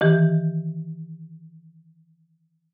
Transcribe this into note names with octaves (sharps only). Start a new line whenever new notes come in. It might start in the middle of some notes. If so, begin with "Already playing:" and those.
D#3 E3 G4